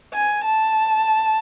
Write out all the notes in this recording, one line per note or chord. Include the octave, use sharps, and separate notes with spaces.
G#5
A5